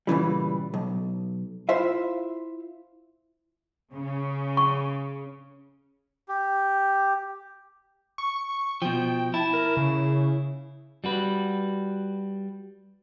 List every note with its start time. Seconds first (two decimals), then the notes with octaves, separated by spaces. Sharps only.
0.07 A#2 C#3 E3 G3
0.74 B1
1.69 E4 F4 C5 E5 F5
3.93 C#3
4.57 C#6
6.28 G4
8.18 C#6
8.82 B2 F3 G5
9.34 E4 A5
9.53 A#4
9.77 C#3
11.04 G3 F#4 B4